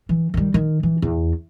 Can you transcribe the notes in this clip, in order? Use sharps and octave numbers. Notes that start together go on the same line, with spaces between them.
E3
D#3 G3
D#3
E3
E2